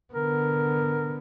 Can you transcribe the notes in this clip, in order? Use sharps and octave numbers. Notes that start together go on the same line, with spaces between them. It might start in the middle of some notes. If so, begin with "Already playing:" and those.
D3 B3 A#4